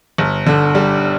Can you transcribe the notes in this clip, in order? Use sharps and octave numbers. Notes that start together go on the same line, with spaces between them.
G1
D3
G3